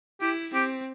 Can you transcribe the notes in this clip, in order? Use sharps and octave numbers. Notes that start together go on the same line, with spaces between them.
E4 G4
C4 G4